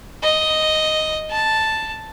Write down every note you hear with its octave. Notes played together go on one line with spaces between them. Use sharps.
D#5
A5